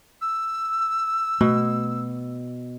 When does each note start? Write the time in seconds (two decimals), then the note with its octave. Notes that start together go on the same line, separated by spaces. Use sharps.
0.22 E6
1.41 B2 A3